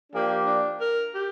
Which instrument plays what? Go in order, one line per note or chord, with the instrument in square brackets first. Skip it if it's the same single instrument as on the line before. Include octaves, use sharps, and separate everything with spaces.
[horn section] F3 A#3 G4 [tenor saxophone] D4
[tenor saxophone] D4
A#4
G4